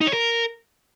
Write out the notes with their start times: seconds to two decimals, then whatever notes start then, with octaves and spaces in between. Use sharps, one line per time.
0.01 D#4
0.07 C#5
0.13 A#4